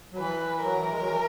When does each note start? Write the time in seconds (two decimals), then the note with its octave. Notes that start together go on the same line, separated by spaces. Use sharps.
0.13 F#3
0.19 E3 B4
0.62 F#3 A#4
0.77 E3
0.91 G#3
1.00 F#3
1.08 E3